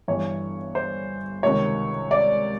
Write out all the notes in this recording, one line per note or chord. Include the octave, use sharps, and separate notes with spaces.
G1 G2 E3 C#5
C5
C#2 C3 D#3 C#5
D5